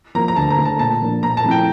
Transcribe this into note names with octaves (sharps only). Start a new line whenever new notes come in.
F3 A#3 A#5
A#5
D2 A5
A#5
D3 A3
A5
A#2 A5
F3 A#3 D4
A#2 A#5
A5
F3 A3 C4 E4
G5